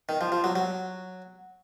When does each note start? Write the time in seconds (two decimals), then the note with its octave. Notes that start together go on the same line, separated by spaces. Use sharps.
0.09 D#3
0.21 F3
0.32 F3
0.44 F#3
0.56 F#3